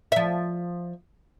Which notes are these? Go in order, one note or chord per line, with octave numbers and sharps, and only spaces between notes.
F3 E5